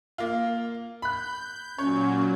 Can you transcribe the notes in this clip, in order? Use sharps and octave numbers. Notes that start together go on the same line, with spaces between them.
A#3 F4
B5 F#6 G6
A#2 F#3 C#4 C#5